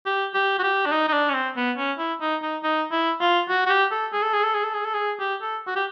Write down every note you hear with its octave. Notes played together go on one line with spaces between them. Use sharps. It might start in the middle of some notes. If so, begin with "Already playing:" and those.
G4
G4
F#4
G4
D4
D#4
D#4
D4
C#4
C4
B3
C#4
E4
D#4
D#4
D#4
E4
F4
F#4
F#4
G4
A4
G#4
A4
G#4
A4
G#4
A4
G#4
A4
G#4
G4
A4
F#4
G4